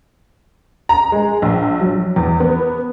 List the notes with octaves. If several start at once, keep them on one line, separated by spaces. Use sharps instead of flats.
A#5
G#3
A#1
F#3
E2
B3